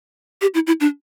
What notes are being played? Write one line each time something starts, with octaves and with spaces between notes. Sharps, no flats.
G4
E4
E4
D4